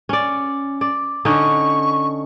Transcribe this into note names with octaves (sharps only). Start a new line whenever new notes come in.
C#4 D5
D5
D3 C#4 D#4 C#6